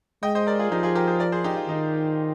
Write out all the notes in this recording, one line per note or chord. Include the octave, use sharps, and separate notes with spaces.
G#3 D#5 G5
C5 D#5
A#4 D5
F4 G#4
F3 D#4 G4
F4 G#4
G4 A#4
G#4 C5
A#4 D5
G#4 C5
D#4 G4
F4
D#3 D#4